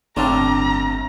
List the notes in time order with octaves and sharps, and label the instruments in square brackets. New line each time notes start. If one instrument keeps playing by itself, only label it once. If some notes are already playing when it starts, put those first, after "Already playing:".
[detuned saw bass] G1 [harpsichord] A2 C4 F4 [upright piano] D4 A5 [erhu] A#5